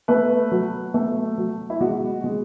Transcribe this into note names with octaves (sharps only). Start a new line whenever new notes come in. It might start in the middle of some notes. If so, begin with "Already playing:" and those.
A3 B4
F#3
A3
F#3
E4
G#3 F#4
G#3